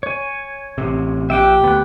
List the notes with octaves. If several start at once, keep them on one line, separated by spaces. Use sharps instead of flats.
C#5 G#5
A1 C3
A#1 G4 E5 G5 F#6
D2 B3 F#6